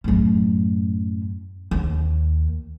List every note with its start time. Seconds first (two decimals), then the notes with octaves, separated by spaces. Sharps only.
0.04 F#2 A2
1.71 D#2